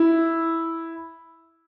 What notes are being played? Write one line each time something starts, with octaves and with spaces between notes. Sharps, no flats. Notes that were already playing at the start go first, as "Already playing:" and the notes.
Already playing: E4